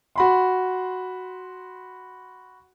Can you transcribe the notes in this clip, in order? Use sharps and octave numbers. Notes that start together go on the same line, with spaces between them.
F#4 B5 C6